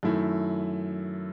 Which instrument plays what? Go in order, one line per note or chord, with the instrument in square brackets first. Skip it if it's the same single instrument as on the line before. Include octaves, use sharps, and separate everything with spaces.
[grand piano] F#2 D#3 A3 E4